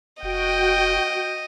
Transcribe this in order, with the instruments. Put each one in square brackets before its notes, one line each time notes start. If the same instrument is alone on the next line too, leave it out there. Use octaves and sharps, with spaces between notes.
[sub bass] F1 [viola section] F#4 G5 [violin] D#5